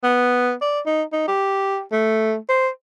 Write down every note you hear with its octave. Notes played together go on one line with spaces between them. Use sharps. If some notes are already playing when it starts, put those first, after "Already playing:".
B3
D5
D#4
D#4
G4
A3
C5